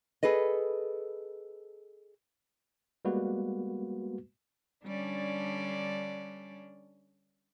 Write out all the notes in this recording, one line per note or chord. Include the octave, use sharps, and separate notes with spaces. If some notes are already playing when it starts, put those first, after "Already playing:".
G#4 A4 B4 D#5
G3 G#3 A#3 B3 F#4 B4
D3 G3 C#4 D4 D5